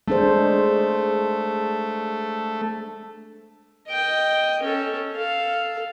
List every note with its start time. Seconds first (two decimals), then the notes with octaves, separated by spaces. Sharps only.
0.08 G#3 A3 D4 C5
3.88 D#5 G5
4.63 C#4 A4
5.16 A4 F5